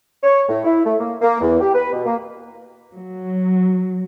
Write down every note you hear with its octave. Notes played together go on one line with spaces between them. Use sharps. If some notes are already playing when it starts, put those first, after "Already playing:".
C#5
A2
E4
A3
A#3
A#3
E2
G4
B4
B2
A#3
F#3